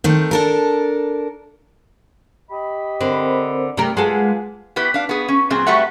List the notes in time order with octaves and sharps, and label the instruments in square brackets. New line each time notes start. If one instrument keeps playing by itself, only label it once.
[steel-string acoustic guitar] D#3 A3 C4
D4 A4 A#4
[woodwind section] G4 D#5 B5
[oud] D3 [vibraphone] C4 A#4 C5
[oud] C3 A3 A#4
[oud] G#3 A#3 A4 [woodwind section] F4 B4 G#5 [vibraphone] F#5
[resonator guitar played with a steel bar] B3 E4 G4 B4
D4 F5
B3 G#4
C#4
A#2 F#3 C4 G#4
G3 A3 F#4 B4 E5 F#5